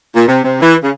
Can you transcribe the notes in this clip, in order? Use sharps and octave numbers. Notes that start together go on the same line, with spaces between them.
A#2
C3
C3
E3
C#3